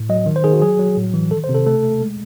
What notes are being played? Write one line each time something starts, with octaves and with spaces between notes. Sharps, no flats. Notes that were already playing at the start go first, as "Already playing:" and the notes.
Already playing: A2
F#3 D#5
D#3
C5
D#3 G#4
F#4
F#3 G#4
F#3
A2
E3
D#3 A4
C5
C3
A4
A3 A4
A3
G#3